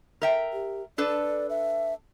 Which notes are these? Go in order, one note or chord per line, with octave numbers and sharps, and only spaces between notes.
A#4 E5 G5
G4
D4 A4 B4 D5
E5